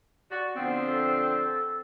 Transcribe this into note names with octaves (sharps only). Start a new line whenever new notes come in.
F#4 D5
D3 F3 B3 C4
A4